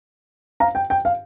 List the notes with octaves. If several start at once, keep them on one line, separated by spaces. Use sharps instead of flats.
F5 A#5
G5
G5
F5